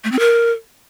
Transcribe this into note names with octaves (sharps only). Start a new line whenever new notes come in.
A3
C4
A#4